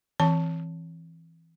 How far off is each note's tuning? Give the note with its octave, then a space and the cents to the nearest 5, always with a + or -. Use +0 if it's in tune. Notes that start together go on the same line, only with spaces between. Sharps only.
E3 +0 C4 +25 A5 +0